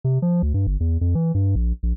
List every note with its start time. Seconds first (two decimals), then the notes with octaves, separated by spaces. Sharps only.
0.04 C3
0.22 F3
0.42 D2
0.54 G2
0.67 G1
0.80 E2
1.01 F2
1.15 E3
1.35 G2
1.55 A#1
1.83 A#1